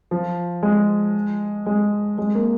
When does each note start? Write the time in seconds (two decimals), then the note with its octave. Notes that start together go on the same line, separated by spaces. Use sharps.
0.11 F3
0.63 G#3
1.66 G#3
2.18 G#3
2.35 A#3